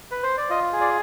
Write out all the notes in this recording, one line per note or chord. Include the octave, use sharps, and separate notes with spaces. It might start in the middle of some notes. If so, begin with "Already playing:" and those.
B4
C5
D5
F4 D#5
G#4
D5